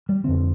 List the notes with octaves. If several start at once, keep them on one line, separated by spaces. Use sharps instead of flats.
G3
F2 D3 C4